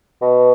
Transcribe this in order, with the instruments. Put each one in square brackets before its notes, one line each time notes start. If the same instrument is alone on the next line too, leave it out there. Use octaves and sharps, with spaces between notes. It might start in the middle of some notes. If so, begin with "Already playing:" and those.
[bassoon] B2